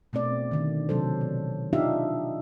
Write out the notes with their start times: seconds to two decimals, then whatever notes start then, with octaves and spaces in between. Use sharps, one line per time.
0.13 B2 A3 C4 D5
0.51 D3 D#3
0.89 C3 F#3 A4 C5
1.21 B2
1.73 D4 D#4 F4 G4 E5 F5